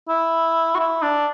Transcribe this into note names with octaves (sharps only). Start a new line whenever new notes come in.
E4
F#4
E4
D4